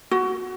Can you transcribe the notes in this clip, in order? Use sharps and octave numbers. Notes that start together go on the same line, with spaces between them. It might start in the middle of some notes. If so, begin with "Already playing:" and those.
F#4